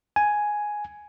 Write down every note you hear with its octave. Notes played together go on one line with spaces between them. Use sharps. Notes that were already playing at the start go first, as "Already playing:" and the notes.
G#5